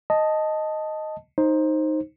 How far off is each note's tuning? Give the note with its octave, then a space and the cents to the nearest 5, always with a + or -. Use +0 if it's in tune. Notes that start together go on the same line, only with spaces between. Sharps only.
D#5 +0 A5 +0
D#4 +0 C5 +15